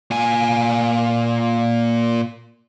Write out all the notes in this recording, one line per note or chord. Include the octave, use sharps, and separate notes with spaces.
A#2 G#5